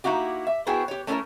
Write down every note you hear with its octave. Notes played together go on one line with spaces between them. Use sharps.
A#3 D#4 E4 F#4 G4
E5
B3 E4 F#4 G#4 C5 G5
G4 C#5
A3 C#4 D4 E4 A4 A#4